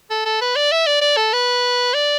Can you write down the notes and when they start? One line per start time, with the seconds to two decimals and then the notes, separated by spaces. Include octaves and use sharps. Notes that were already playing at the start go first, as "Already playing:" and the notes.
0.10 A4
0.25 A4
0.42 B4
0.56 D5
0.72 E5
0.87 D5
1.01 D5
1.17 A4
1.33 B4
1.94 D5